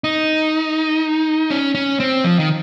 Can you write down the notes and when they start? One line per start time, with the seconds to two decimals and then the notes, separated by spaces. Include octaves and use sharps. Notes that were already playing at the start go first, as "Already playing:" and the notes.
0.04 D#4
1.50 C#4
1.75 C#4
2.00 C4
2.24 F3
2.39 D#3